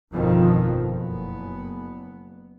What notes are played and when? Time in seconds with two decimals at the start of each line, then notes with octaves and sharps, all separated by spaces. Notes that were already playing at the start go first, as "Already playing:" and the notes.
0.12 G1 F2 B2 D#3 F3
0.93 F#1 B3